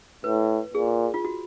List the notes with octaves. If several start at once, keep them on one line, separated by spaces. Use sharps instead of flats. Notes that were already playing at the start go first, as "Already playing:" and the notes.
A2 B4
A#2 G#4
F4
F#4